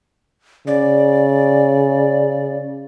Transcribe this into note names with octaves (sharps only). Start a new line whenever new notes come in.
C#3 D5